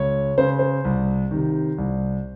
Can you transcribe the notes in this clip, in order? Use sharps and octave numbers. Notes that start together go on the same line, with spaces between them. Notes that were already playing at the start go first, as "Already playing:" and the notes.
Already playing: C#2 C#5
C#3 C5
C5
C2
C3 D#3
C2